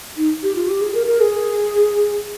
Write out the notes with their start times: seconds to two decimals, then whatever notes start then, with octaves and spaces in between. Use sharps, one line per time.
0.17 D#4
0.43 G4
0.56 F4
0.68 G4
0.81 G#4
0.94 A#4
1.07 A#4
1.21 G#4